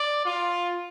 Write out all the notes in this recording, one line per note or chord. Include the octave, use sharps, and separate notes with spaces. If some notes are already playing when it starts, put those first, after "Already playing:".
Already playing: D5
F4